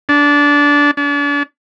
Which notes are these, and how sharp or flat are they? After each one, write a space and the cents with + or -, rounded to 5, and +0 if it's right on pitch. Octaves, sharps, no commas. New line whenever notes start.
D4 -20
D4 -40